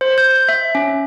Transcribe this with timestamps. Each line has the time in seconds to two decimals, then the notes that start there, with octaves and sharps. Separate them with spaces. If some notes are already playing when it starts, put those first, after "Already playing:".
0.01 C5
0.18 G6
0.49 E5
0.75 C#4